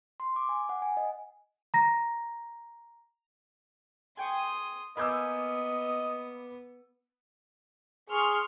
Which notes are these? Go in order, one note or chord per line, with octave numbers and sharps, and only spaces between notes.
C6
D6
G#5
F#5
G#5
D#5
A#5 A#6
G#4 G5 C6 C#6 D#6
A#3 B3 D#5 G#5 B5 D6 E6 G6
G#4 C6 C#6 F6